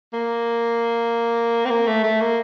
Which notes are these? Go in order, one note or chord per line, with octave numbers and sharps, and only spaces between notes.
A#3
C4
A#3
A3
A3
A#3